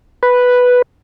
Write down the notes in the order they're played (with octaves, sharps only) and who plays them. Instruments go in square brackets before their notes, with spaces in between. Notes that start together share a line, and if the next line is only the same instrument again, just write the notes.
[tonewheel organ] B4